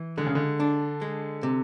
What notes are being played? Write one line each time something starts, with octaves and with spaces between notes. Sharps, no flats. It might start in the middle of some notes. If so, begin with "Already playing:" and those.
Already playing: E3
D3 G#3
C#3
D3
D4
G#3
C3